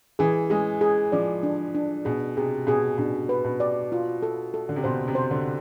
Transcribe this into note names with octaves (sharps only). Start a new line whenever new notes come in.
E3 G#4
G#3 G#4
G#4
F3 D5
D4
D4
B2 G#4
C3 G#4
B2 G#4
B2 D4
B4
B2
D5
F4
A4
A4
D3
C3
B2 C5
C3
C5
D3